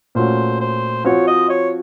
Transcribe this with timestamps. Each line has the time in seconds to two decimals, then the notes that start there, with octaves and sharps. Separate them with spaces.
0.15 A#2 A3 C#4 F#4 C5
0.61 C5
1.04 F3 C4 F#4 C#5
1.27 D#5
1.49 C#5